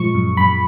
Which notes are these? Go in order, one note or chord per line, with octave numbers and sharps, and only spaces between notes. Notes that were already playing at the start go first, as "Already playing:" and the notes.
Already playing: A#2 F3 G#3 C#6
F#2
F#2 B5